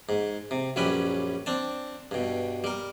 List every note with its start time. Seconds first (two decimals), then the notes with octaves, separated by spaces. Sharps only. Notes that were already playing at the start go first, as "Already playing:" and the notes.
0.09 G#2
0.51 C3
0.76 A#1 F#2 G3 C#4 B4 B5
1.46 C4 D4 A5
2.11 G2 B2
2.64 G3 A#4